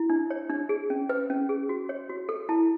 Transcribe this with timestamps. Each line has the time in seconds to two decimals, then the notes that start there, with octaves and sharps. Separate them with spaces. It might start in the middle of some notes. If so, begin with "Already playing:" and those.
Already playing: E4
0.10 D4
0.30 C#5
0.50 D4
0.69 G#4
0.90 C#4
1.09 B4
1.30 C#4
1.49 G#4
1.69 F#4
1.89 C#5
2.09 F#4
2.29 A4
2.49 E4 A5